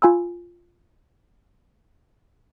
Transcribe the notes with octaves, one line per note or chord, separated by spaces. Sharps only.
F4 G#5 B5 E6